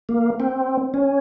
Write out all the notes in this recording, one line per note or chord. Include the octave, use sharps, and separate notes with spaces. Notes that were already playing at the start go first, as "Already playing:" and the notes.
A#3
C4
C#4